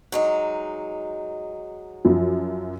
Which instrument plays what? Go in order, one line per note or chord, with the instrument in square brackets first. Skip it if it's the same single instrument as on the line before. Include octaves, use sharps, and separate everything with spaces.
[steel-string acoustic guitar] F#3 G#3 D#4
[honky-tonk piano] F#2 F3